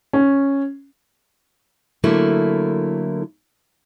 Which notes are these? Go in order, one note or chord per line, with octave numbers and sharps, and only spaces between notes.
C#4
D3 F#3 A3 A#3 E4